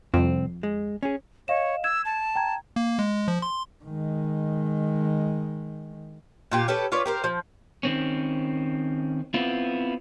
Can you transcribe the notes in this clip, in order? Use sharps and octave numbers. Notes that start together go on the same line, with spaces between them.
C2 F2 C4
G#3
C#4 G#4
C#5 D#5 F5 E7
E6 G#6 E7
A5
G5 A#5 G#6
A#3
G#3
F3
C6
D#3 G#3
A#2 F4 G4
C#4 G4 A4 B4
F4 B4 C#5 D5
G4 A#4 C5
F3
D#3 C4 C#4
B3 C4 E4 F4